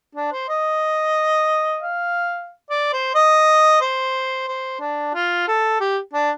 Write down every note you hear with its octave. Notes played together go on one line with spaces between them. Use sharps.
D4
C5
D#5
F5
D5
C5
D#5
C5
C5
D4
F4
A4
G4
D4